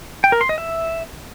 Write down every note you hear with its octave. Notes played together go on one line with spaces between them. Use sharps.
G5
A#4
C6
D#5
E5